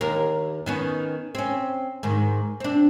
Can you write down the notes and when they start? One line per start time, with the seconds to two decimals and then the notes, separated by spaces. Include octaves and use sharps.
0.01 D#2 A#4
0.66 D#3 B3 C#4
1.35 C4 C#4
2.03 G#2 D#3
2.60 C4 D4